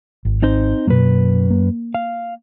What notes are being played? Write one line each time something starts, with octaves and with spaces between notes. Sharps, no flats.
G#1
C4 D#4 C5
F#2 B2 A#3 B4
A#3
F5